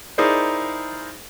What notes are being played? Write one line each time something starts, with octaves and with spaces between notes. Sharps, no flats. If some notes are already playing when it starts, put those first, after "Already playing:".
D#4 E4 G#4 A#4 C5 D5